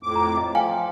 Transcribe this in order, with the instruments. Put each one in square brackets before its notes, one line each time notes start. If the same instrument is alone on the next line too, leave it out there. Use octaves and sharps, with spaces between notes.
[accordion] F2 A2 D6
[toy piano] A#5
D#5
[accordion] F3 [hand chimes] F5 [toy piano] G5 G#5